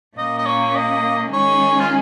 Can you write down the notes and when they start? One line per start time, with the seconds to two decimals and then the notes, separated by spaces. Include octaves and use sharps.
0.17 A#2 A#3 C#4 D#5
0.38 D#5
0.46 C#5
0.76 D#5
1.33 D#3 G#3 C#4 G#4 C#5
1.80 F4